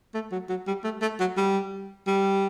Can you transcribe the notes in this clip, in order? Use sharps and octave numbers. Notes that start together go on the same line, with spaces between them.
A3
F#3
F#3
G3
A3
A3
F#3
G3
G3